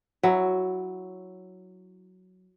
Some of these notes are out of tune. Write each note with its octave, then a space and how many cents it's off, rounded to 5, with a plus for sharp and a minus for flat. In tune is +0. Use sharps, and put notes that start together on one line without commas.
F#3 +0 E4 +0 F#5 +0